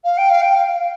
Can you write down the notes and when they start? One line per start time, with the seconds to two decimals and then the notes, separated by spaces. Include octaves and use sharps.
0.04 F5
0.17 G5
0.30 F5
0.42 G5
0.55 F5